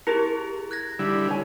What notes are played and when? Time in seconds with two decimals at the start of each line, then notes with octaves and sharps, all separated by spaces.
0.07 E4 G4 G#4 A#4
0.71 F#6 G#6 A#6
0.99 D3 G3 E4
1.28 C#5 G#5